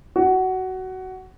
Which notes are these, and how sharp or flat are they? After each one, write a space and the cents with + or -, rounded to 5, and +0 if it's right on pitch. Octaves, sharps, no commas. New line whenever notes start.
F#4 +15